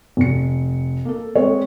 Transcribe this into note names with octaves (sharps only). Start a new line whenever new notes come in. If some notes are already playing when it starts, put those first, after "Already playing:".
F1 C#7
A#3 A4
G#3 C4 G#4 C#5